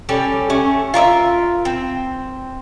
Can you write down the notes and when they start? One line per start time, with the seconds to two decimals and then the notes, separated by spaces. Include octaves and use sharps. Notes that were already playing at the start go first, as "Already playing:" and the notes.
0.09 G3 C#4 G4 A4
0.50 A3 C#4
0.94 F4 A#4 D5 E5
1.65 C4